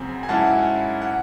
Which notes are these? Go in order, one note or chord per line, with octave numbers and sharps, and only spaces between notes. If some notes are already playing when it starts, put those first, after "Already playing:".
Already playing: F#2 C#3 F#3 C4 G#5
G#5
G#2 F#3 C#4 E4 F#5 A5
F#5